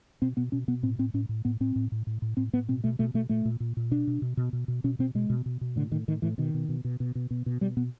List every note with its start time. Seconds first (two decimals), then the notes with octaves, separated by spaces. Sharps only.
0.22 B2 C4
0.37 B2 B3
0.52 B2 C#4
0.68 B2 B3
0.83 A2 C4
0.99 A2 C4
1.14 A2 C#4
1.29 A2
1.45 A2 B3
1.60 A2 C4
1.76 A2
1.92 A2
2.07 A2
2.22 A2
2.37 A2 C4
2.53 A2 B3
2.68 B2 C4
2.84 B2 A3
2.99 B2 A3
3.14 B2 A3
3.29 A#2 A3
3.45 A#2
3.60 A#2
3.77 A#2
3.91 B2 D4
4.07 B2
4.22 B2
4.37 B2
4.53 B2
4.68 B2
4.84 B2 C#4
4.99 B2 C4
5.15 B2 G#3
5.30 B2
5.46 B2
5.61 B2
5.76 A2 D3
5.91 A2 D#3
6.08 A2 D#3
6.22 A2 E3
6.38 B2 D#3
6.54 B2
6.69 B2
6.85 B2
7.00 B2
7.15 B2
7.31 B2
7.46 B2
7.61 B2 G3
7.77 B2 B3